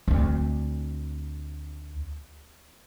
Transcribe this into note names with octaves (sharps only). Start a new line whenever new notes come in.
D2 C4